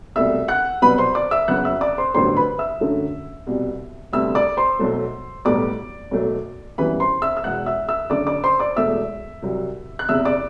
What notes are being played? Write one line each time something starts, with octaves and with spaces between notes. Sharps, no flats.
C2 B2 A3 E5 E6
F#5 F#6
C2 B2 F#3 B3 B4 B5
C5 C6
D5 D6
E5 E6
F#1 F#2 F#3 B3 F#5 F#6
E5 E6
D5 D6
C5 C6
A1 G2 D3 F#3 B3 C5 C6
B4 B5
E5 E6
F#2 D3 F#3 A3
C2 B2 G3
D2 C3 G3 B3 E5 E6
D5 D6
C5 C6
B1 B2 F#3 A3
B1 A2 G3 B3 D5 D6
B1 B2 F#3 A3
F#2 E3 G3 B3 B4 B5
C5 C6
E5 E6
E6
E1 E2 B2 F#5 F#6
E5 E6
E5 E6
F#1 F#2 D3 D5 D6
D5 D6
C5 C6
D5 D6
E1 E2 B2 A3 E5 E6
C2 C3 F#3
F#6
F#1 E2 C3 E5 E6
D5 D6